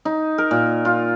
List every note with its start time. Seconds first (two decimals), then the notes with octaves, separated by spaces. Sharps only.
0.05 D#4
0.38 A#4
0.51 A#2
0.85 F4